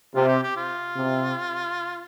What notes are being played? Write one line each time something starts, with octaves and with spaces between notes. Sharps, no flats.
C3 F4
G4
G4
F4
C3